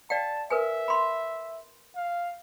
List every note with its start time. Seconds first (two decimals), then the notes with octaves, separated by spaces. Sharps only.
0.10 D5 F5 G5 A5
0.50 A#4 B4 E5 G#5
0.88 B5 C6
1.96 F5